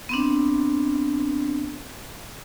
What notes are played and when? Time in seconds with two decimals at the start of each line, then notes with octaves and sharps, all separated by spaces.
0.09 B3 C4 D4